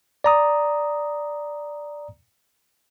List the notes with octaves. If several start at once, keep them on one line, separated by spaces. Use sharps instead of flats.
D5 A#5 D#6